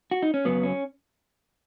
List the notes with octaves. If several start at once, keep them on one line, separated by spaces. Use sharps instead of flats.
F#4
D#4
C#4
F#2 C#3 F#3 B3
C#4